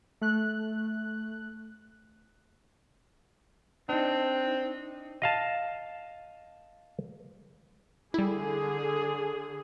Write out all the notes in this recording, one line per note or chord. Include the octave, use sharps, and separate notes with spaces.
A3 F#6
C4 D4 D#4
D#5 F5 A5
D3 G3 E4 G#4